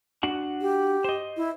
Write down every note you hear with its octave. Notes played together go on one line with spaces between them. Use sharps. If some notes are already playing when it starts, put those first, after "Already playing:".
D4 F#4 F#5
G4
C5 D#5
E4